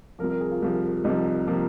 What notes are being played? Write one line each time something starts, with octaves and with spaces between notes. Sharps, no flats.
C2 C3 F3 A#4
A#4
G#4
F4
C2 C3 F3
C2 C3 F3 D#4
C3 F3 A#3